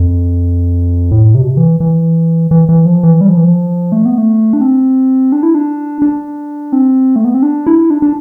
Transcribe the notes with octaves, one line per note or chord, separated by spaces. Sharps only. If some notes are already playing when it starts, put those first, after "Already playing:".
Already playing: F2
A2
C3
B2
C3
E3
E3
E3
E3
F3
E3
G3
F3
E3
F3
A3
B3
A3
D4
C4
D4
E4
D4
D4
C4
A3
B3
C4
D4
E4
D4
D4